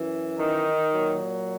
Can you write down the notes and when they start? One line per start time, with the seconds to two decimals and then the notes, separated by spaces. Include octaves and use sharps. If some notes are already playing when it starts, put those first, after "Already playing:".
Already playing: F#2 E3
0.38 D#3 D#4
0.93 A#2 F#3